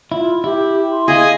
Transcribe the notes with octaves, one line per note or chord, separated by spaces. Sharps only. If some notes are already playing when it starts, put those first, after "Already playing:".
E4 F4
E4 G4
C6
G#4 D#5 F5 G#5 D#6